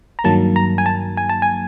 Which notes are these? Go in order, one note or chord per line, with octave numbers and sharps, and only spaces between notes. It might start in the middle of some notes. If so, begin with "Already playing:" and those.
A#5
G2 D#3 F#3 A#3 A5
A#5
G#5
A5
G#5
A5
G#5